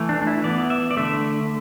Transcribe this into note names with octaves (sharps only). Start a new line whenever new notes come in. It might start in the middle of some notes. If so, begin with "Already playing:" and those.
Already playing: E3 A3
D4
D4
E4
E3 B3 D5
E5
D5
D3 A3 E5